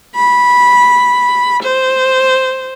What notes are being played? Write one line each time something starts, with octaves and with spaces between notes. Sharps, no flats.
B5
C5